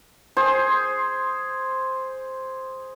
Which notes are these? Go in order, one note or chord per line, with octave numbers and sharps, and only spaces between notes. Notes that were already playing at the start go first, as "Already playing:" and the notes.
G#4 C5